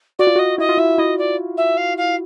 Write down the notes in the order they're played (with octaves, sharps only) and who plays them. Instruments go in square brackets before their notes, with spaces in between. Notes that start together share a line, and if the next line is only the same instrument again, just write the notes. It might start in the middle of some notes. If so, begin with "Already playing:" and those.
[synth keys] F#4 [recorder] D5
[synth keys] F4
[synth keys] F#4 [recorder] D#5
[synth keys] E4 [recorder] D#5
[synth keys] F4
[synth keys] E4 [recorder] E5
[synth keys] E4 [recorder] D#5
[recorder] D5
E5
F5
F5